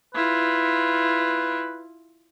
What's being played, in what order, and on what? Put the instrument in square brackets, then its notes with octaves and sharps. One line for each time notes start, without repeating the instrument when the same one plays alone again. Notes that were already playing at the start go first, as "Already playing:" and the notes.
[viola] E4 F4 [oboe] B4